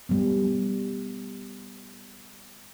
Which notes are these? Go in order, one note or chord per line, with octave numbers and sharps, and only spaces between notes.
G3 A3 B3